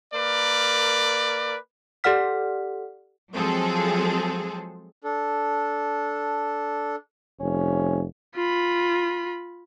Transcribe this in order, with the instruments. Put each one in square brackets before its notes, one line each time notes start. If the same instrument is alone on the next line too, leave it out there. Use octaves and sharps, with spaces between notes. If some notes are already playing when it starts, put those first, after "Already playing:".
[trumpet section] A#3 A#4 B4 D5
[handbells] G4 A4 D5 F#5 F6 B6
[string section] F3 F#3 G#3 C4 G#4 A4
[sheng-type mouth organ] D4 A4
[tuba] F1 [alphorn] C#4
[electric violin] F4 B5